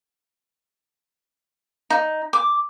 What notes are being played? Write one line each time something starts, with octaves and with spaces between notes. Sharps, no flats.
D#4
D6